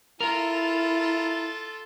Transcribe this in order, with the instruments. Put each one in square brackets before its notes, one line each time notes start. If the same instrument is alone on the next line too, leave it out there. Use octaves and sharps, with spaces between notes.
[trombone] E4 [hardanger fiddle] F4 A4 [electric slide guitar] A#4